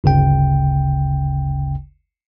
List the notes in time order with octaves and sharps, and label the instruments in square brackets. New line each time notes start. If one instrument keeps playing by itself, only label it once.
[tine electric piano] G1 D2 C#3 G5